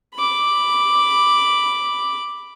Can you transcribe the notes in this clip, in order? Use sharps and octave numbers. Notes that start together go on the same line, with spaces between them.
B5 D6